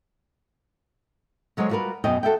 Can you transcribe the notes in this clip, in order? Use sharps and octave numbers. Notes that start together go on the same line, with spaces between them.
D3 F#3 G#3 C5 C#5
G3 F4 F#4 G#4 A#4 B4
F#2 B2 C#5 D#5 G5
F#4 A4 E5 G5